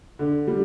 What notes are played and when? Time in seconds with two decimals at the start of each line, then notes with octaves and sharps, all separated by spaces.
0.19 D3
0.47 G3